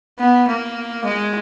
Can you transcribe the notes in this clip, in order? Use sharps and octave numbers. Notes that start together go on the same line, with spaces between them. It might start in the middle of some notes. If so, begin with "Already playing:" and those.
B3
A#3
G#3